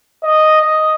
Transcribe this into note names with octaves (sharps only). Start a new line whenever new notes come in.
D#5
D#5